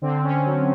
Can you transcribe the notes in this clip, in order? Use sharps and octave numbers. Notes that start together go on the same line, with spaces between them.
D3 C4
D3 C#4
F#3